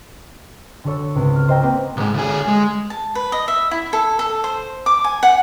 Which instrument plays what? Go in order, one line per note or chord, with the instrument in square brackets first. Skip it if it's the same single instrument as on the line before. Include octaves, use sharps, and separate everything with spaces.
[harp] D3 F#4 A4 C#5 E6
G#1 C#2
F6
C5 D#5 E5 G5 A#5
A#3 C4 B4 F#5
[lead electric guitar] B1 G#2
D2 G#4
G#3
[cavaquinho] A5
B4
D#5
E5
E4
A4
A4
C5
D6
G#5
F#5